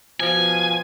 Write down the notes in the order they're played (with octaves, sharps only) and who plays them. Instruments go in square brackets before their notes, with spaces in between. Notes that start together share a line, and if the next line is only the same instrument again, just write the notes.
[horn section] B2 F3 [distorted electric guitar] G#5